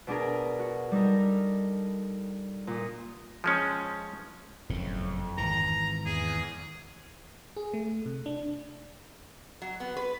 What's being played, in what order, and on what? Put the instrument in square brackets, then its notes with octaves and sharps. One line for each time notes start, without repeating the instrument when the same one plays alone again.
[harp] B2 D4 G#4 A#4
F#4
G3 D#4 A4 A#4
F6
A#2 D#6
[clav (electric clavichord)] F3 G#3 C#4
[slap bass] F#1 A2 C#3 [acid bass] F2
[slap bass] G#1 E3 [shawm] A#5
[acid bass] E2 [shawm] G#4
[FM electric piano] G#4
A3
C3
D4
[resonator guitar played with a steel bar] F#3
B3
B4